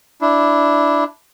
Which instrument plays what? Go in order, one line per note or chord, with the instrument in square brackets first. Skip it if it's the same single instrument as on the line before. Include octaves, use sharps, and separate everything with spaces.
[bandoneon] D4 E4